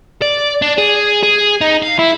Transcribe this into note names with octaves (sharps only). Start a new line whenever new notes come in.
D5
D4
G#4
G#4
D#4
F5
E4